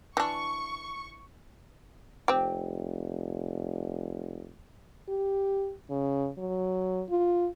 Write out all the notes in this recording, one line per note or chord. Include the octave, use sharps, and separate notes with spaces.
E3 D4 C#6
F1 C4 G4
G4
C#3
F#3
F4